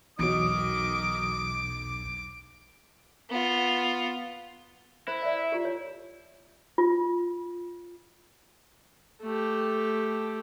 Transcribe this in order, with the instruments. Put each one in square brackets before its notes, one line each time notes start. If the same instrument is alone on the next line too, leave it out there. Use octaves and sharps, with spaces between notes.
[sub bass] B1 [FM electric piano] E2 B2 F#3 [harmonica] D#3 D#5 D#6 [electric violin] D6
[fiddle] B3 F4
[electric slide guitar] E4 [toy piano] C5
[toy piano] D5 E5
F4 G4
C#5
F4
[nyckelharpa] A3 G4